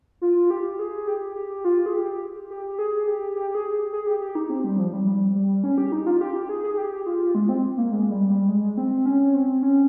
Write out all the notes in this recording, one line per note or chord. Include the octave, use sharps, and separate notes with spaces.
F4
G4
G#4
G4
G4
F4
G#4
G4
G4
G#4
G4
G4
G#4
G#4
G4
G4
D#4
C4
G3
F3
G3
G3
G3
C#4
G4
D#4
F4
G4
G4
G#4
G#4
G4
F4
G#3
C4
A#3
G#3
G3
G3
G#3
C4
C#4
C4
C#4